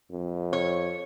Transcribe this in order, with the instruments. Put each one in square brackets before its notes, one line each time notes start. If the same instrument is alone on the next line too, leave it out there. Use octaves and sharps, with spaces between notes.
[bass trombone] F2
[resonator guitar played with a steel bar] C#5